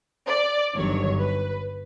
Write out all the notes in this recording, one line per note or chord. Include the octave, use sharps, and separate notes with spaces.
D5
G1 G2 D#3 F#3 C#5
B4